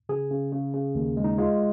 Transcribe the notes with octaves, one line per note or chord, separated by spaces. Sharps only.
C#3 G#4
C#3
C#3
C#3
D#2
G#3
D#4
G#3 F4